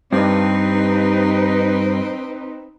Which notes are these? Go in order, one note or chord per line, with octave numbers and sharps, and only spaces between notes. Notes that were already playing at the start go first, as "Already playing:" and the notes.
G2 C4 D#4 B4